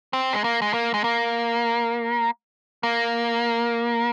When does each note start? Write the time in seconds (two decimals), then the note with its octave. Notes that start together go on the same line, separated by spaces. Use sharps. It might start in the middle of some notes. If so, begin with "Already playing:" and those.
0.13 C4
0.33 G#3
0.44 A#3
0.62 G#3
0.74 A#3
0.94 G#3
1.04 A#3
2.83 A#3